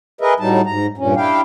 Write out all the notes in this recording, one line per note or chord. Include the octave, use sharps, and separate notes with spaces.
G#4 A#4 B4 D#5 E5
A2 F#3 G3 D#4 A5
G#2 A#5
G2 A#2 C#4
D4 E4 G4 F5 G5